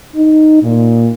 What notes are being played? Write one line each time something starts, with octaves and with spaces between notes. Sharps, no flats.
D#4
A#2